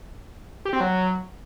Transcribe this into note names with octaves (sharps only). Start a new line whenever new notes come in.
G4
C4
F#3